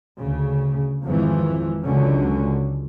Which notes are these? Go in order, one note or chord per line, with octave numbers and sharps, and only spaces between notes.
D2 C#3
G#1 F2 E3 F3
C#2 D3 F#3 C#4